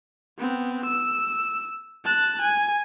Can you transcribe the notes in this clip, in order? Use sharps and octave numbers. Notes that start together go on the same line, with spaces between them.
B3 C4
E6
A5 F#6
G#5